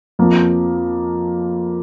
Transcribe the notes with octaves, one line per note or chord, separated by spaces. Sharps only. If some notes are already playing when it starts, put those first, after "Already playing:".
F2 F3 A#3